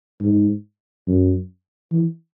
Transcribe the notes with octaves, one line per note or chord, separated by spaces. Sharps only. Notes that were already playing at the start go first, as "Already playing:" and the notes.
G#2
F#2
E3